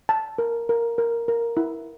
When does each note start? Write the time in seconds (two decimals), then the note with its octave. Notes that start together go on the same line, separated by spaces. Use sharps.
0.09 A5
0.38 A#4
0.69 A#4
0.98 A#4
1.28 A#4
1.57 E4